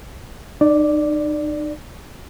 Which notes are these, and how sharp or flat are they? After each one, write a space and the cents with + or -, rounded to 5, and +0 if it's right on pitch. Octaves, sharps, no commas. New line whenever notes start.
D#4 -35 D5 +0